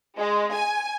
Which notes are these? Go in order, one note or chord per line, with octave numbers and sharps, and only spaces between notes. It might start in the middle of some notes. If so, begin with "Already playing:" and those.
G#3
G#5